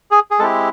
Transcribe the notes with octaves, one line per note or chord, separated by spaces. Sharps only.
G#4
G#4
G#3 C4 E4 G4 A4